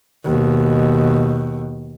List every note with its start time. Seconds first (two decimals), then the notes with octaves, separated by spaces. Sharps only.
0.24 D#2 B2